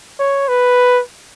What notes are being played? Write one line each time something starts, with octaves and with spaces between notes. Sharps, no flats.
C#5
B4